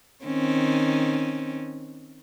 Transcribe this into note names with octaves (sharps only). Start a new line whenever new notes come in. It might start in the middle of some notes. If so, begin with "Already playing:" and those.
D#3 C4 C#4